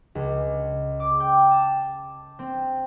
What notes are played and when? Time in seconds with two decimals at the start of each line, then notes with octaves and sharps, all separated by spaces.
0.15 C#2
1.00 D6
1.20 G5
1.51 A5
2.39 C4